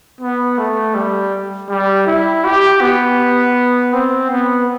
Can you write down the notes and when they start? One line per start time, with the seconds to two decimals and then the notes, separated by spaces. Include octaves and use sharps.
0.21 B3
0.58 A3
0.95 G3
1.69 G3
2.06 E4
2.44 G4
2.81 B3
3.93 C4
4.30 B3